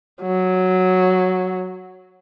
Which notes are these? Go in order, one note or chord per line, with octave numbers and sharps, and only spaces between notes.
F#3